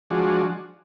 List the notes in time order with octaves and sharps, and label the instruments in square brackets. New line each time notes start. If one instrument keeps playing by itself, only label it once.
[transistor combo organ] F3 G#3 D4 F#4